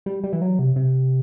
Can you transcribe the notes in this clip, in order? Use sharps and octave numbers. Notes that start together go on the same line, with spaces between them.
G3
G3
E3
F#3
C3
C3